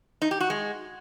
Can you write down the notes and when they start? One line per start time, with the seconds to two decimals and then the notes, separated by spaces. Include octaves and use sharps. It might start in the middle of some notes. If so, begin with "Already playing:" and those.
0.22 D#4
0.31 G4
0.40 F#4
0.50 G#3